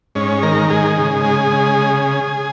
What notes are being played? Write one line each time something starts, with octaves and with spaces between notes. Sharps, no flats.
G#2 C#4
D#3 A#4
G#2 G#4
C#3
G#3
C#3